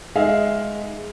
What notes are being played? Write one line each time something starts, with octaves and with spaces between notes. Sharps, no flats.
G#3 D#4 G#4 E5 F5